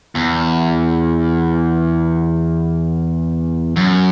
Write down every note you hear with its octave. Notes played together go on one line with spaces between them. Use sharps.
E2
F#2